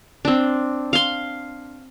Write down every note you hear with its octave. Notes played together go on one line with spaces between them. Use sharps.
C4 D4
F5 C6